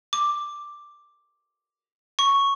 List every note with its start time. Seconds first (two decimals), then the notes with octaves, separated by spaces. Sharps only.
0.13 D6
2.19 C#6